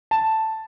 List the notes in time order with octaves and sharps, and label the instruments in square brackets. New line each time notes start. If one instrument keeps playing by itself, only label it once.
[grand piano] A5